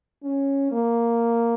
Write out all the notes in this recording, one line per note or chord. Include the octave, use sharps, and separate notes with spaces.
C#4
A#3